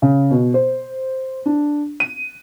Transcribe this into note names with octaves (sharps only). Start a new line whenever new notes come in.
C#3
B2
C5
D4
D#7